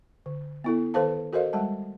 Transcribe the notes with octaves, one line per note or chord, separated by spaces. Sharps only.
D3
B3 E4 A4
D#3 A4 B4 C5 F5 A5
F#4 A4 A#4 C5 D#5 F5
G3 G#3 F#5 A5